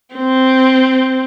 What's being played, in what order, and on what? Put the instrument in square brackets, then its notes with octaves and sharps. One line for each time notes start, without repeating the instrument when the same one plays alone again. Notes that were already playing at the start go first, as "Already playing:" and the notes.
[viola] C4